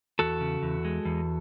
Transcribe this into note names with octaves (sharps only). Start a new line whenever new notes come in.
E2 F#4 A4
C#3
E2
G#3
E2